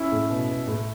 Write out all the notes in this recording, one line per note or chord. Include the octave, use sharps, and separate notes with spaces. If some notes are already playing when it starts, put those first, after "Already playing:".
Already playing: C#4 E4
A2
B2
B2
A2